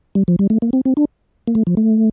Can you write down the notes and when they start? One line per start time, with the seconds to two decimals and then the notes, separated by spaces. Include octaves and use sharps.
0.15 G3
0.28 F3
0.39 G3
0.50 A3
0.62 A#3
0.73 C4
0.85 C4
0.97 D4
1.48 A#3
1.55 A3
1.67 F3
1.77 A3